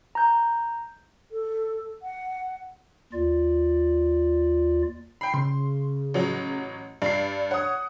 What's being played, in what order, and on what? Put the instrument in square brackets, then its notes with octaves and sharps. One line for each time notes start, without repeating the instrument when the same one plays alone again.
[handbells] A#5 G6
[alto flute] A4
F#5
[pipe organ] D#2 F4 D5
[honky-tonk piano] G5 B5 [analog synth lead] C7
[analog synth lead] C#3 [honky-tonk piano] C6
[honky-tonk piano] A1 F#3
[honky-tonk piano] G2 C7 [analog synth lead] D5
[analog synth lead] C#5 [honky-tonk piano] F#5 D#6